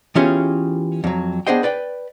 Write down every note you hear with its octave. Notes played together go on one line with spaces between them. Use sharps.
E3 B3 C#4 F4 G4 G#4
F2 F#3
B3 D4 G#4 C5 D#5 G5
B4 D5 G5